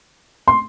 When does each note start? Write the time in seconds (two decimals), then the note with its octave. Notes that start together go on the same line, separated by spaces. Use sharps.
0.48 C6